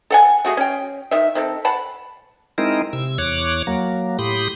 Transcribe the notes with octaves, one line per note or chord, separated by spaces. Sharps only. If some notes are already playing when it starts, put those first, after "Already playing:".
A4 F#5 G#5
A3 F#4 G#4
C#4 G5
D#3 E5
D#3 C4 A4
F#5 A5 B5
G#3 C4 D#4 E4 A#4
C3 E6
E2 C#5 D6 F#6
F#3 A#3
A2 G4 B5 C6 D#6